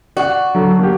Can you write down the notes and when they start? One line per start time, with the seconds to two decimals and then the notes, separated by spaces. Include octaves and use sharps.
0.17 F#4 D5 F#6
0.55 D3 F#3
0.79 A#3 G4